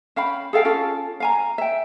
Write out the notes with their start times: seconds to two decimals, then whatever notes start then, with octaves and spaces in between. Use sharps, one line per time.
0.16 C#4 F5 G5 B5
0.53 G#4 A4 F5 G5
0.65 C#4 F4 A4
1.20 F5 G#5 A#5
1.58 E5 G5